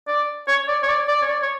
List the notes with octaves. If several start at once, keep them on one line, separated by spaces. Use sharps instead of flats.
D5
C#5
D5
C#5
D5
D5
C#5
D5
C#5